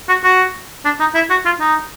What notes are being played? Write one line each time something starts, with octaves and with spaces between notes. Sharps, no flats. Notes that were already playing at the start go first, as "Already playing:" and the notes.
F#4
F#4
D4
D#4
E4
F#4
F4
D#4